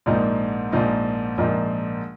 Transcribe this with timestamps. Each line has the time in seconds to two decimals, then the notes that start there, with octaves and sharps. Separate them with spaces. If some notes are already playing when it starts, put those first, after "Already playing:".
0.06 A#1 G#2 F3 A#3 D#4
0.72 A#1 G#2 F3 A#3 D#4
1.38 A#1 G#2 F3 A#3 D#4